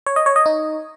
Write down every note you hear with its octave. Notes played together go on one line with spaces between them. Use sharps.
C#5
D#5
C#5
D#5
D#4